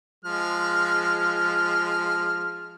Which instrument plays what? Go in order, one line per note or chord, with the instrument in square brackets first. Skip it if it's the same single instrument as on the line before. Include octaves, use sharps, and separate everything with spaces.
[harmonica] F3 G#3 F6